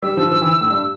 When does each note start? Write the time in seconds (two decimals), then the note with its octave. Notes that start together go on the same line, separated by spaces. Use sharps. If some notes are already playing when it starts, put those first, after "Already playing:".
0.02 G3 E6
0.17 F3
0.31 F3
0.42 E3
0.61 A2
0.70 G2